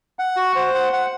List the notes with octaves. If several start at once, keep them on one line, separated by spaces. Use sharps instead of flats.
F#5
F#4
C5
F#5
F#5